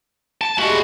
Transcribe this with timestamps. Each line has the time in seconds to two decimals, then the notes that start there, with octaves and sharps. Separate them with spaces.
0.41 A5
0.58 A#2 G3 G#3 E4 F#4